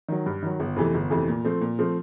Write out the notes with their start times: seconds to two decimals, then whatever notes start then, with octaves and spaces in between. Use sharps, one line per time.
0.09 D#3 F#3
0.26 G2
0.43 D#3 F#3
0.60 G1
0.76 F2 C3 E3 A3
0.94 G1
1.10 F2 C3 E3 A3
1.28 A#2
1.44 F3 A3 C4
1.61 A#2
1.79 F3 A3 C4